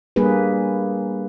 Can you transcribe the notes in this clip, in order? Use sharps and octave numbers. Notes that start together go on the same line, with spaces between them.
G3 A#3 D4 G#4 B4